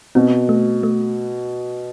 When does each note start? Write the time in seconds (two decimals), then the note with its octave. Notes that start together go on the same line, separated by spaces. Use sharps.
0.15 B2 C4
0.49 A3
0.83 A3